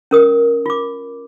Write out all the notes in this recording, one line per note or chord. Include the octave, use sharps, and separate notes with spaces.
C#4 A#4 D#6
F4 D6